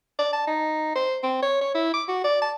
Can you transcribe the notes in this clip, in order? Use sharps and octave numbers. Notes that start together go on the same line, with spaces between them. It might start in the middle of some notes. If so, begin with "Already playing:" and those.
D5
A5
D#4
C5
C4
C#5
C#5
E4
D6
F#4
D5
A5